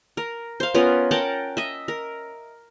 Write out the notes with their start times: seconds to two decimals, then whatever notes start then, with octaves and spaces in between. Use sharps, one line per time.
0.17 A#4
0.60 C5 F5
0.75 B3 C#4 F4 A#4
1.11 A#4 F#5 G5 A5
1.57 D#5 E5
1.88 A#4